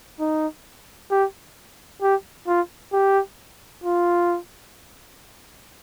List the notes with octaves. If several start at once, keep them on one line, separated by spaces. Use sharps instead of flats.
D#4
G4
G4
F4
G4
F4